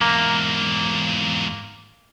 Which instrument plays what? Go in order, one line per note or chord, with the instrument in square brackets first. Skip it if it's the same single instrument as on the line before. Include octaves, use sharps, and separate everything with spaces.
[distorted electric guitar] E2 G#2 [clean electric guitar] A#3